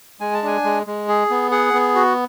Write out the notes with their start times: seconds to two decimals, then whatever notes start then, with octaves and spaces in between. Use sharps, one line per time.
0.20 G#3 G#5
0.34 A5
0.43 D4 G#5
0.64 G#3
0.87 G#3
1.08 G#4
1.30 B3
1.51 G#4 F#5
1.73 B3
1.95 F#4